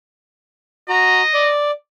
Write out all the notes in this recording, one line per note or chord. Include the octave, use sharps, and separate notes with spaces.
F#4 D#5 A#5
D5